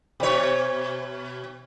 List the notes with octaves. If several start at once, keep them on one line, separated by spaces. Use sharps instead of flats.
B2 C#5